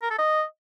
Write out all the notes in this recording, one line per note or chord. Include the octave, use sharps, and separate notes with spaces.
A#4
A4
D#5